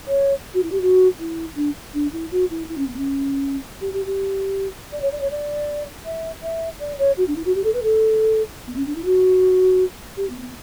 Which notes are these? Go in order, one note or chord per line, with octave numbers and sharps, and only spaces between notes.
C#5
F#4
E4
G4
F#4
E4
D4
D4
E4
F#4
E4
E4
C#4
B3
C#4
G4
G4
G4
D5
C#5
D5
C#5
D5
E5
E5
D5
C#5
F#4
D4
E4
F#4
G4
A4
B4
A4
B3
C#4
D4
E4
F#4
G4
B3
B3